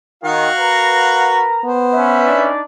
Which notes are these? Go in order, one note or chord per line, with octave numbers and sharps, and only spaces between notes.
D#3 F#4 F5 F#5
A#4 B4 A#5
B3 C5
C#4 B4 E5
D4 D#4 D5